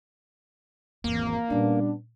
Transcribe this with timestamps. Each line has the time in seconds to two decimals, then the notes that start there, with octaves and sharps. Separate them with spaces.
1.04 G#1 E2 A#3
1.50 A#2 G3 B3 C#4 D4